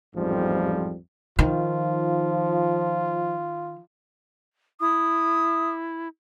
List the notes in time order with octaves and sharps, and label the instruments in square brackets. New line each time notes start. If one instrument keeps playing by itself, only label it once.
[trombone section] A1 F2 G#2 F3 G3
[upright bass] D#3 [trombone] F3 [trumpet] F4
[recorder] E4 [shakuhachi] D#6